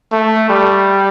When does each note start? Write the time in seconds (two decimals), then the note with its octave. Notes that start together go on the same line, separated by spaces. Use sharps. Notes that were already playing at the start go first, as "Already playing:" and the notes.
0.12 A3
0.50 G3